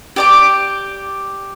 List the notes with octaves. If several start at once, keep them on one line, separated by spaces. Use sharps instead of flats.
G4 D5 D6